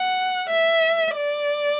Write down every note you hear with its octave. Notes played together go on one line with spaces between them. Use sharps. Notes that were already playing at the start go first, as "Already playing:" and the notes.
Already playing: F#5
E5
D5